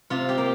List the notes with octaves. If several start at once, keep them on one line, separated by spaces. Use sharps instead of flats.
C3 F4
G4
A#3